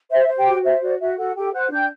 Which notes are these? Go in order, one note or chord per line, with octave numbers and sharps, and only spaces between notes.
C5 E5
C5
G4 G5
F#4
C5 E5
F#4 D5
F#4 E5
F#4 A4 F#5
G4 A4 G5
C5 F#5 F#6
D4 G5 G6